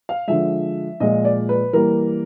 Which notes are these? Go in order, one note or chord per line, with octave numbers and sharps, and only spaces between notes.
F5
D3 F3 G#3 E5
A#2 F3 G#3 D#5
D5
B4
E3 G3 A#3 A#4